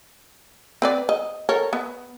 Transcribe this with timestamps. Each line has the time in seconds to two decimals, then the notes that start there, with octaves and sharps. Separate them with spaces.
0.82 C4 B4 D5
1.09 D#5
1.49 A4 A#4 C#5
1.73 B3